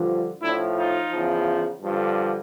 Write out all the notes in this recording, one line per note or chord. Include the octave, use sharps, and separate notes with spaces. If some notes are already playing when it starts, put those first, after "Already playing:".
Already playing: G2 D3 F3
A2 F3 D4 E4
D#4 F4
E2 C#3 F3
G2 D3 F3